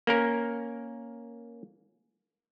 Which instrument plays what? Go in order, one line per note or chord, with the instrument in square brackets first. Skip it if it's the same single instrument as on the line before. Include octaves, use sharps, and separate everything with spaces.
[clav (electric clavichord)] A#3 C#4 A#4